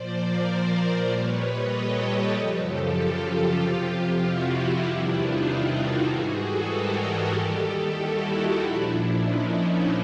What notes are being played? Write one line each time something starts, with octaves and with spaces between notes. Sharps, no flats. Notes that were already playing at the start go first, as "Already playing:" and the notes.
Already playing: A#2 F3 C5 D5
A#4 C5
A#2 G3 B4 C#5
C#5 D#5
G4 A4
F#2 C#3 F3
G4 A4
F4 G4
F4 G4
F2 C3 F3
F4 G4
E4 F#4
E2 C3 D#3 G3 D4 E4
D#4 F4
D#4 F4
E4 F#4
G#2 E3 G3 F#4 G#4
G4 A4
G#4 A#4
G4 A4
D#2 D#3 G3
E4 F#4
D#4 F4
A#2 F3 D4 E4
D4 E4
C#4 D#4
D4